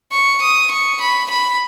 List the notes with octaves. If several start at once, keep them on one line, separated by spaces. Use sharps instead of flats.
C#6
D#6
C#6
B5
B5